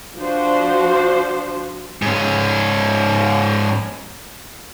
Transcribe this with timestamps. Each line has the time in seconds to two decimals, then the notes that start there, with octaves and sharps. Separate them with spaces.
0.17 F3 D4 F#4 C5
2.02 G#2 C#4